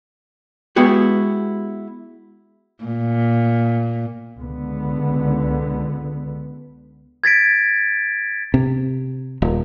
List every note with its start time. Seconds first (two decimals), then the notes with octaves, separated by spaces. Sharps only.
0.76 G#3 B3 E4 F#4 G4
2.84 A#2
4.38 C#2 D3 B3
7.24 G#6 A6 B6 D7
8.54 C3
9.42 D#1